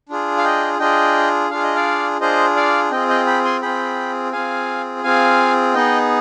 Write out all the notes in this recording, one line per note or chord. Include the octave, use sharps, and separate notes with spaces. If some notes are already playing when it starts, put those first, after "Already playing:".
D4 F4 G#4
F5
D#5 G5
D4 F4 G#4 D#5 G5
D4 F4 G#4 F5
D#5
D5 F5
D4 F4 G#4 C5 D#5
D5 F5
C4 F4 G#4 D#5 G5
D#5 G5
G5 B5
G#5 C6
C4 F4 G#4 G5 B5
C4 F4 G#4 F5 G#5
C4 F4 G#4 F5 G#5
B3 D#4 G#4 D#5 G5